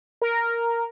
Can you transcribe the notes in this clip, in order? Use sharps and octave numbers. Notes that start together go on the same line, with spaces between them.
A#4